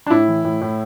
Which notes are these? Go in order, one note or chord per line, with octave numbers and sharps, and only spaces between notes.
D4
A2 E4
E3
A2
A2